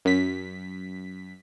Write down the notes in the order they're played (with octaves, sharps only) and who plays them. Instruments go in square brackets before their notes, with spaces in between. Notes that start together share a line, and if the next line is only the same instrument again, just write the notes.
[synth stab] F#2 B6